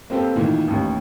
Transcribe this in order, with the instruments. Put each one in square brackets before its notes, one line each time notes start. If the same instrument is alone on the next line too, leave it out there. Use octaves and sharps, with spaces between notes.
[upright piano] A#3 C4 G4 A4 B4
A#2 D#3 E3
A1 D#2